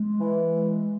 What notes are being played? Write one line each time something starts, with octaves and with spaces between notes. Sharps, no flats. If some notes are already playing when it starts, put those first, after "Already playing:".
Already playing: G#3
E3
G#3